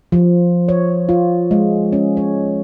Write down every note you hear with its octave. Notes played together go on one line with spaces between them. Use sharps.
F3
C#5
F4
G#3
C#4
C#5